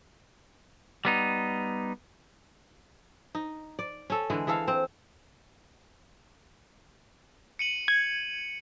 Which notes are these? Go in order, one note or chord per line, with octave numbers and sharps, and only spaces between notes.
G3 B3 D#4
D#4
D5
C#4 A4
D3 E3 G#3
E3 G#4 A4 F5
C4
C#7 D#7 F#7
G#6